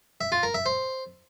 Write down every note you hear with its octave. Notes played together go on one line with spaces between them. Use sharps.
E5
F4
A#4
E5
C5